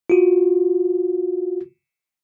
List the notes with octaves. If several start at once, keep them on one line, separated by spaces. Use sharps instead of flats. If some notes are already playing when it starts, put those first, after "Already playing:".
F4 F#4